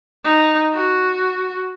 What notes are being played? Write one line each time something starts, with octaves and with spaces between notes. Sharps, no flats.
D#4
F#4